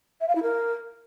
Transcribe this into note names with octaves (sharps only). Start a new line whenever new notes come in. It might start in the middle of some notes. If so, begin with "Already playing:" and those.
E5
F5
E4
A#4